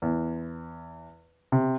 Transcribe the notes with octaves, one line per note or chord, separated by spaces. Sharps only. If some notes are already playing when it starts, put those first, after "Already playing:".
E2
C3